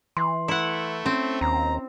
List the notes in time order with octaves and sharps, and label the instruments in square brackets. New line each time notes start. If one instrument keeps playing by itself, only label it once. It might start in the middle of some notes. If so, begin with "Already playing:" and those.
[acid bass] E3 [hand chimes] C6
[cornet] A3 [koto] E4 F#5
[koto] C4 [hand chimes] C#4
[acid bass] D#2 [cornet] A#5